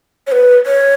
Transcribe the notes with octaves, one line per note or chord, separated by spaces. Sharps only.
C#5
B4
C#5